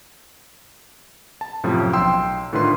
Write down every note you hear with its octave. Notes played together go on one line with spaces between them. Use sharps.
A5
F#2 A2 C3 F3
B1 G5 C6 E6
A2 D3 D#3 F4 B4 C6